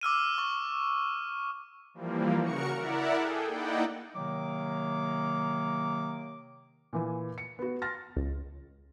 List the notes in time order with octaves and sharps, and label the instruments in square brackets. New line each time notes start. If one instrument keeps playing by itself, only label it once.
[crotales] D6 E6 F6 D#7
C#6
[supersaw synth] E3 F3 G3 A#3
C#3 F#4 A#4 C#6 C#7
E4 A#4 D5 E5 F#5
G#4 A4 G5
A#3 D#4 E4 D5 F#5 G5
[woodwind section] C3 D#3 F#3 A#3 D6
[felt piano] A#2 E3 G#5
C#7
B3 F#4
C6 F6 A6 A#6
[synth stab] C#2